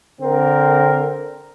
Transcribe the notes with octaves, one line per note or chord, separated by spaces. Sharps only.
D3 C4 A#4